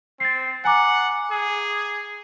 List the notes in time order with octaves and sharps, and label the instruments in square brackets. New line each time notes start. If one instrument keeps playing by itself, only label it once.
[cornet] C4 [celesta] A6 C7
[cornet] F#5 [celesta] G#5 A#5 D6
[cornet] G#4